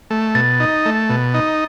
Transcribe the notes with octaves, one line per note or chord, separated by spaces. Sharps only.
A3
B2 A6
D#4
A3
B2
D#4